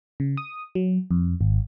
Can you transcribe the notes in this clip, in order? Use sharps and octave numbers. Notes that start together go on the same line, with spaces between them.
C#3
D#6
F#3
F2
G#1